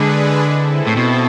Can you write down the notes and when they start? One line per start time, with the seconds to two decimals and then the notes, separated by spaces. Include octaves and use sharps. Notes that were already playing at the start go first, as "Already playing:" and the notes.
Already playing: D3 G#3 D4 G#4 B4
0.41 C4 E4 A4
0.87 A2
0.97 B2